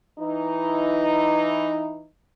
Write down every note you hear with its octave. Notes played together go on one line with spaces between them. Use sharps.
E3 D#4 E4